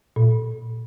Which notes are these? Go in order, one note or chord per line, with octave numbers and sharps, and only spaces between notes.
A#2